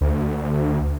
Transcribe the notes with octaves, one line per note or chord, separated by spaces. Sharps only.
D2